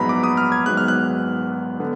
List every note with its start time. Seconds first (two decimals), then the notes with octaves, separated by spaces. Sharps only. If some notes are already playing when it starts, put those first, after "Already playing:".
Already playing: A#1 G#2 F#3 B3 A#5 B5
0.09 D6
0.24 D#6
0.37 F6
0.52 G#6
0.66 G#1 G#2 F#3 B3 F#6
0.77 F6
0.88 F#6
1.80 D3 B3